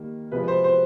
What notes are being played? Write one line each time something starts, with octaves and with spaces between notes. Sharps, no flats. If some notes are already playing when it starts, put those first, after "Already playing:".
Already playing: D#3 G3 A#3
C3 F3 G#3 B4
B4
C5
C5